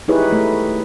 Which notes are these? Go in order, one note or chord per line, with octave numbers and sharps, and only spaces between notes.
D#4 E4 G4 G#4 B4 C#5
A3